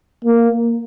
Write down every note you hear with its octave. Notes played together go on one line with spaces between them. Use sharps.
A#3